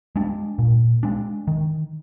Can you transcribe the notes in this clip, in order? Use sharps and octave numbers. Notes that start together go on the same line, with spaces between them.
G#3 D4
A#2
G#3 D4
D#3